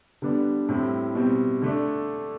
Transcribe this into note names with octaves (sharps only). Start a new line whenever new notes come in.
D3 G3 B3 D4
A2 G3 C4 E4
B2 G3 C4
D3 A3 D4